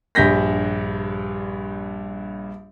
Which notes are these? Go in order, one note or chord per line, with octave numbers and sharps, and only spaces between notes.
A#1 G2 G6 A#6 B6